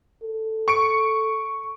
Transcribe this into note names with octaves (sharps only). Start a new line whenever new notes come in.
A4
C#6 C#7 D7